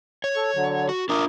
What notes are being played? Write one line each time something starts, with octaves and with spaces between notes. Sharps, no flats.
C#5
A4
D3 F#3
F#4
D4 F4 A#4 E5 D6 D#6